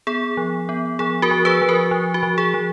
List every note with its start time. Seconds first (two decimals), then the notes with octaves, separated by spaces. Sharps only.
0.07 B3 G#4
0.37 F3
0.69 B3
0.99 F3 G#4
1.22 F#4 A#4
1.31 F3
1.45 G#4 B4
1.62 F3
1.69 F#4 A#4
1.91 F3
2.14 F#4
2.23 F3
2.38 G#4
2.54 F3